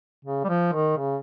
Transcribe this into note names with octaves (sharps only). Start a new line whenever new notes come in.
C#3
G3
F3
D#3
C#3